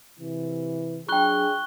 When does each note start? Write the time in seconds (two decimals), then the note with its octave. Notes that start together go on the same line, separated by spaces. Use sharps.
0.19 C3 E3
1.09 F#3 D4 F4 G#4 G5 C#6 F#6 G7